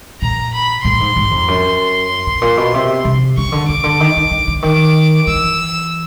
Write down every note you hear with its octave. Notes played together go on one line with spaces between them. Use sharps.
A#2 A#5
B5
A2 C6
G#2
G#2
F2
F#2
G#2
A#2
B2
C3
C3
C#3 C#6
D3
C#3 D6
D3
D#3
D3
D3
D3
D#3 D6
E3 E6